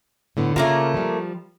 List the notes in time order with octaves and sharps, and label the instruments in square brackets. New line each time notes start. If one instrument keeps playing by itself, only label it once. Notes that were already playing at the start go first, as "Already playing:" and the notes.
[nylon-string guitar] A2 D3 B3
[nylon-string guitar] C#3 F4 A#4 [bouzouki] A3 A#3 A#5
[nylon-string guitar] F3 G3